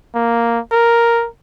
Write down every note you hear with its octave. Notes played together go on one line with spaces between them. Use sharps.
A#3
A#4